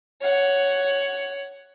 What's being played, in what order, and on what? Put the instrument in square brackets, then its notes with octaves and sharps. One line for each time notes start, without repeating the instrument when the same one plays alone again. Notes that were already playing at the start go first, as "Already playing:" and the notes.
[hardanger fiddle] C#5 F#5